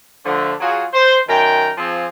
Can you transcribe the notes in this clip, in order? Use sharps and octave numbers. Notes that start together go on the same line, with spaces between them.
D3 F3 A3
F#3 F4 F#4 G#4
C5
F#2 D#3 A#4 G5
F3 C4 G#4